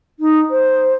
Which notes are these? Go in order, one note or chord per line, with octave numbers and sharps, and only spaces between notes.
D#4
C5